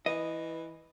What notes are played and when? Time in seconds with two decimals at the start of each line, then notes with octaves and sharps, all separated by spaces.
0.06 E3 D#5